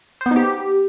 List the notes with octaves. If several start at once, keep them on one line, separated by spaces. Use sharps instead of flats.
C5
B3
D#4
G4